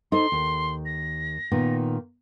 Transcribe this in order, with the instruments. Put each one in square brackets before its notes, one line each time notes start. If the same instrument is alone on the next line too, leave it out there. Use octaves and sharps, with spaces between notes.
[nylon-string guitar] D#4 A4 C5 [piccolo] C6
[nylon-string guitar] D#2
[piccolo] A#6
[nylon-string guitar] A#2 D#3 B3